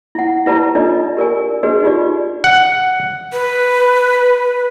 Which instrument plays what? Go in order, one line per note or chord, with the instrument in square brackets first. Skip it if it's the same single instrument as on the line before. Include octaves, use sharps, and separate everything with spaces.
[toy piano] E4 F#5
E4 G4 B4 D5 A5 A#5
D4 D#4 F4 A4 D5 D#5
G4 A#4 D5 G#5
D4 F#4 G#4 B4 D5 D#5
D#4 F4 G4 D5
[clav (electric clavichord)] F#5
[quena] B4